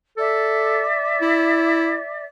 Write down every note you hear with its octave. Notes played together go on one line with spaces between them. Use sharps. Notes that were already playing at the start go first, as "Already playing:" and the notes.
A4 D5 E5
E4